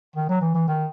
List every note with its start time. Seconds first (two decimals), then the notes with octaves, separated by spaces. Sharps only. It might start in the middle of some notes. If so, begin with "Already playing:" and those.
0.16 D#3
0.29 F#3
0.41 E3
0.54 E3
0.68 D#3